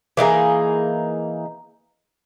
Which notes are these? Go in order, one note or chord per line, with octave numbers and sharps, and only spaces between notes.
E3 A#3 D#4 G#4